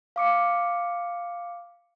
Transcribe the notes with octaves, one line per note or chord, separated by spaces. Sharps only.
F5 D6 C#7